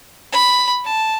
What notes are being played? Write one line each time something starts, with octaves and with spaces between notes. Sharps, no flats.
B5
A5